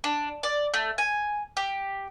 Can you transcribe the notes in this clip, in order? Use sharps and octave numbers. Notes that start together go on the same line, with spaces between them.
D4
D5
A3
G#5
G4